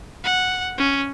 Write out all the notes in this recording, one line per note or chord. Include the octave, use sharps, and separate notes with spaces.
F#5
C#4